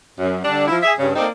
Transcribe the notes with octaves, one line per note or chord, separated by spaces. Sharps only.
F#2
D3 G3 D4
F3 E4
G#4 E5
G2 C#3
A#3 C4 D#4 A4 D5